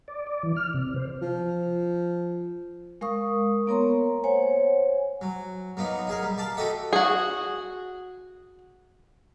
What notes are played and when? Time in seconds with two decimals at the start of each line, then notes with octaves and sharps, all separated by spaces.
0.08 D5
0.27 D5
0.43 E3
0.56 F6
0.74 C3
0.96 C5
1.22 F3
3.01 G#3 A#4 F5 C#6 D#6
3.67 A#3 B3 A#4 C#5 A#5 C6
4.24 C5 C#5 F#5 G#5
5.21 F#3
5.77 F#3 A#3 B3 D#4
6.07 D#4 G#4 A#4
6.22 G3
6.38 D5 F5 A5
6.57 F#4 G4 A4 D#5 E5 F#5
6.93 F#4 G#4